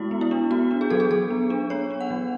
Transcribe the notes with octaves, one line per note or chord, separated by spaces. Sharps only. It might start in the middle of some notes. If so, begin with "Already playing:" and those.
Already playing: G#3 B3 E4 F#4
B3
E4
D4
B3 F#4
D4
G#4
F#3 A4
G#4
F#3 A4
B3
D4
B3 C#5
D4
F#5
F#3